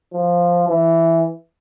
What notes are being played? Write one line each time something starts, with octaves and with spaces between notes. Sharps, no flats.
F3
E3